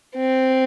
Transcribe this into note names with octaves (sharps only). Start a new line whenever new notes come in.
C4